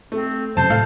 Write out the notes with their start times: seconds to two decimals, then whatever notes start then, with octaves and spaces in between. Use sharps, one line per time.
0.12 A3 C4
0.57 F#2 C3 C5 A5
0.69 A2 A4 F5